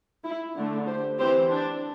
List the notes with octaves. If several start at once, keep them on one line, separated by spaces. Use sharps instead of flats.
E4
D3 A3 D4
G4 C5
E3 C4 G4 C5
D4